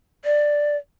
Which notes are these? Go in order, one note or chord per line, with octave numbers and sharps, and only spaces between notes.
D5